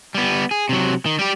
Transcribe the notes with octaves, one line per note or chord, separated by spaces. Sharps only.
G3 B3
G#4
C3 F#3
D#3
G3 G4